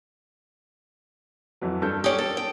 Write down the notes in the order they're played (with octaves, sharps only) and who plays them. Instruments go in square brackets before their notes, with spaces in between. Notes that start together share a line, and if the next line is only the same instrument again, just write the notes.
[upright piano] F2 E3 F#3
G2 A4 G6
[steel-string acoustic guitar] C#4 G4 [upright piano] D#6
[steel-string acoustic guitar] A4
G5